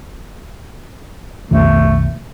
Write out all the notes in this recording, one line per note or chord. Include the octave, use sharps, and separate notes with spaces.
B1 F2 D#3 A3